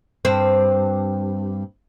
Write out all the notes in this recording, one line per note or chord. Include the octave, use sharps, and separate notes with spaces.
G2 C4